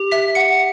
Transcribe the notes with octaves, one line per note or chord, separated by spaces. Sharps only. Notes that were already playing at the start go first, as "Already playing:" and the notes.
Already playing: G4
E5 B6
F#5 C#7